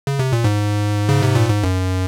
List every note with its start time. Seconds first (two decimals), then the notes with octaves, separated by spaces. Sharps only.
0.07 C#3
0.19 C3
0.32 A#2
0.44 G#2
1.09 C#3
1.22 C3
1.35 A#2
1.50 G#2
1.64 F#2